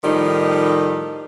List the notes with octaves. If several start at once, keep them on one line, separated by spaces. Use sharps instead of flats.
A2 D#3 F3 G3 D#4